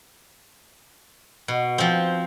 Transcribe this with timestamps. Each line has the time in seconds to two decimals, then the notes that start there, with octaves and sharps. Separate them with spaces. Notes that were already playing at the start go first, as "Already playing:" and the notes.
1.48 B2
1.78 F3 C4